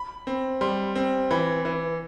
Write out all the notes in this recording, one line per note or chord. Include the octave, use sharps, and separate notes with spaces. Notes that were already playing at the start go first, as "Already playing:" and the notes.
Already playing: B5
C4
G3 C6
C4
E3 B5
E3